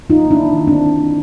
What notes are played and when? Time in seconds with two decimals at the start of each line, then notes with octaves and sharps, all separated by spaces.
0.10 D#4 F4
0.21 F#3 A#3
0.30 D4 E4
0.53 D#3
0.67 C4 D4